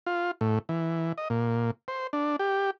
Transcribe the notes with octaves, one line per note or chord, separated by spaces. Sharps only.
F4
A2
E3
D#5
A#2
C5
D4
G4